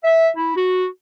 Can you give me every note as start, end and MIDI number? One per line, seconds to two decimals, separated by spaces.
0.04 0.30 76
0.37 0.52 64
0.57 0.86 66